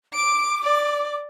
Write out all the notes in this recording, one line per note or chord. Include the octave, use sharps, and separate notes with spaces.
D6 D7
D5